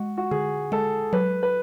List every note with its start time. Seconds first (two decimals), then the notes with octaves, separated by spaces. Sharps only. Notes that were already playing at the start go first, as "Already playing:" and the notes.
Already playing: G#3 F#4
0.18 F#4
0.31 D3 G#4
0.72 G#3 A4
1.13 F#3 B4
1.43 B4